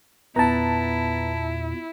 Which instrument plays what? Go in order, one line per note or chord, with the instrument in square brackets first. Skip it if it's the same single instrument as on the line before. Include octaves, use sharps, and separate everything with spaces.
[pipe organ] E2 A#2 [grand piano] B3 [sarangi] E4 [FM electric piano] A5 A#5